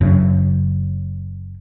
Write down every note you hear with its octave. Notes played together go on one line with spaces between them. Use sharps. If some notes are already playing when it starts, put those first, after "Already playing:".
F#1 F#2 C#3 D4